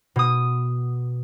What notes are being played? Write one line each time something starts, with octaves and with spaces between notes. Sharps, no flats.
B2 D#6